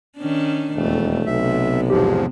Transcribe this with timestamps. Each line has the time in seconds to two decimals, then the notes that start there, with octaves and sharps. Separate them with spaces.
0.18 D#3 C#4 D4
0.76 E1 F2 A3
1.26 B1 C3 B3 E5
1.90 E2 G#2 F3 G4